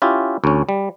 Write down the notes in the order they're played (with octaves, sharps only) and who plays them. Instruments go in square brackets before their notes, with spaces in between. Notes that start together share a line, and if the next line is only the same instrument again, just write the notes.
[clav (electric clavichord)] C#4 E4 F4 G4
D2 C#4
G3